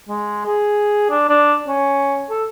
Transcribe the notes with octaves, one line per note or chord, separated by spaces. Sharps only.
G#3
G#4
D4
D4
C#4
A4